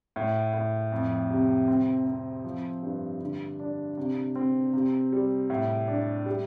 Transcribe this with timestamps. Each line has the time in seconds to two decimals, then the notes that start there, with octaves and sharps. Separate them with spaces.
0.16 A2
0.53 A2
0.92 F2
1.30 C3
1.68 C4
2.06 C4
2.44 F3
2.82 G2
3.21 D3
3.60 D4
3.97 C3
4.36 C4
4.74 C3
5.12 G3
5.50 A2
5.88 D4
6.26 G3